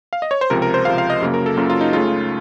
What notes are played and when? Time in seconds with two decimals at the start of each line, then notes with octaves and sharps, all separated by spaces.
0.13 F5
0.22 D#5
0.31 C#5
0.41 C5
0.50 C#2 C3 F3 A#4
0.62 A#4
0.74 C5
0.85 C#2 C3 F3 F5
0.98 F5
1.10 D#5
1.21 F#2 C#3 F#3 A#3
1.34 A#4
1.46 A4
1.57 F#2 C#3 F#3 A#3 F4
1.70 F4
1.81 D#4
1.93 C#2 C#3 A3 F4